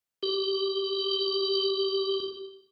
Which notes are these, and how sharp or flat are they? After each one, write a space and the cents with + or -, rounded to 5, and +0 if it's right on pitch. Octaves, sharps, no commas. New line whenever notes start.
G4 -15